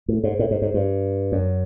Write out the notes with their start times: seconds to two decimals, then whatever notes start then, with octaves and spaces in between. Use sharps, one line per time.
0.08 A2
0.24 G#2
0.39 A2
0.51 G#2
0.62 G#2
0.74 G2
1.32 F#2